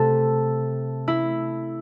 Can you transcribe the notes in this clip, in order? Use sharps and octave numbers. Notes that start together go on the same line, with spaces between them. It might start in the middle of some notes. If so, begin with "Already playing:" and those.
Already playing: C3 A3 A4
E4